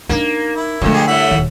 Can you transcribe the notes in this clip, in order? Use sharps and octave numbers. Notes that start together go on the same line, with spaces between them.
A#3 D4 D#4
E4
F2 D3 A3
G4 G#4
A2 G3 E5 F#5
D#1 D#2